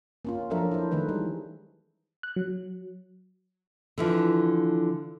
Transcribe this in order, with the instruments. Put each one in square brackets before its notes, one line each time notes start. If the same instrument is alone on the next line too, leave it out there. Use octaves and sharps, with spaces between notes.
[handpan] A#3 C#4 F4
F3 F#3 D4 A4 A#4 E5
E4 C5
D#3 E3 A3 D#4 B4
G3 G#3
[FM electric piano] F#6
F#3
[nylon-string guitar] D3 E3 F3